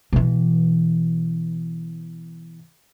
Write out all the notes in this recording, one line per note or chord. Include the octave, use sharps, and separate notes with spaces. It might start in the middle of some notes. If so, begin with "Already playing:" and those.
B2 E3